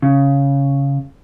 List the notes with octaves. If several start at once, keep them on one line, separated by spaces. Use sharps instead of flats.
C#3